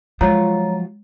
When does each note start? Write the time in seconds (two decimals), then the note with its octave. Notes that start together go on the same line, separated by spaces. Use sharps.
0.21 F3 F#3 G#3 F4 C#5 A#5